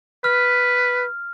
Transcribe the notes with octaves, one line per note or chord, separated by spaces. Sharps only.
B4 F6